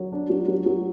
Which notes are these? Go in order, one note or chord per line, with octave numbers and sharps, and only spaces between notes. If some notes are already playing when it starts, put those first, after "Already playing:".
Already playing: F#3
D4
F#3
F#3
F#3